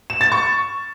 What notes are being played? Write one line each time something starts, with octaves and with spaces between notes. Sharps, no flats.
E7
A6
C#6